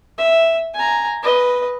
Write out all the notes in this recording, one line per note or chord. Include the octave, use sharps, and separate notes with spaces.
E5
G#5 A#5
B4 D#5